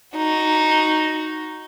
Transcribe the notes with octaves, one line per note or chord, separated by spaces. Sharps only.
D#4 F#4